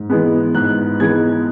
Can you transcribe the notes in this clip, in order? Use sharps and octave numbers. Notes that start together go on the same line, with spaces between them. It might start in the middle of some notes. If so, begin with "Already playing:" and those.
Already playing: G#2
E3 G#3 B3
G#2 F#6
E3 G#3 B3 G#6